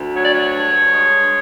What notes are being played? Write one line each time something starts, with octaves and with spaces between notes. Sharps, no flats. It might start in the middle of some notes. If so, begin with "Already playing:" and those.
Already playing: D2
F#3 C#5
D5
C#5
G2
G#3